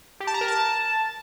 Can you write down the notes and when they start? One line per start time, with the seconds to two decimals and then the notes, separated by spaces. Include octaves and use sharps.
0.20 G4
0.27 A5
0.34 A#5
0.41 A#4
0.48 A5